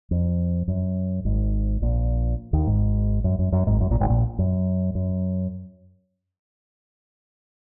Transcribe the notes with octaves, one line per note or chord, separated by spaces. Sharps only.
F2
F#2
G#1 G#2
A#1 A#2
D#2 D#3
G#1 G#2
F#2
F#2
F#2
G#1 G#2
F#2
A#1 A#2
G#1 G#2
A#1 A#2
F#2
F#2